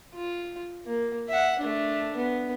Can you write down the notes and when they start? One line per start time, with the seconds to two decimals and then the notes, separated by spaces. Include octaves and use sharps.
0.15 F4
0.86 A#3
1.29 E5 F#5
1.59 A3 D4
2.16 B3